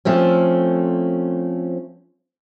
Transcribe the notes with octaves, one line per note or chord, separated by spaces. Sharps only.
F3 A3 C4 C#4